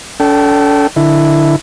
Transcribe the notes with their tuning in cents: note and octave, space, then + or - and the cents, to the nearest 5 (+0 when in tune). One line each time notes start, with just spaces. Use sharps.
D4 -45 A4 +0 G5 -30
D3 +15 E4 +0